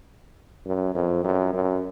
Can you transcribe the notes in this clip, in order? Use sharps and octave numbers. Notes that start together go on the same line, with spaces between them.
F#2
F2
F#2
F#2